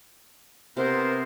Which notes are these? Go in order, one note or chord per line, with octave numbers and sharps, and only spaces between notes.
C3 B3 A#4 C5